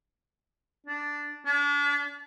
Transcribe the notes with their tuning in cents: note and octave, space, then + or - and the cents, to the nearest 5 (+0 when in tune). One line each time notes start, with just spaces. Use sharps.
D4 -5
D4 -35